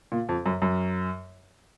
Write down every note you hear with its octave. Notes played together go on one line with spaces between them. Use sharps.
A#2
F2
F#2
F#2